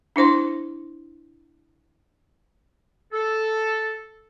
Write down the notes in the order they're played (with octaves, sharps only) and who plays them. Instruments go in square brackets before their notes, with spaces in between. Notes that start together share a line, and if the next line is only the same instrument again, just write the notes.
[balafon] D4 E4 C5 C6
[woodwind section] A4